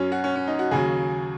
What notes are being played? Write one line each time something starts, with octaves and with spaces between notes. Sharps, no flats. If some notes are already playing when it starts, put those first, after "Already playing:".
Already playing: F#2 F#3 C#4
F#4
C#4
C#4
D#4
F#4
D#2 C#3 F#3 G#4